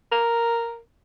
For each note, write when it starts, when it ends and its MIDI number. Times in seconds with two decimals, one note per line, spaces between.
0.12 0.78 70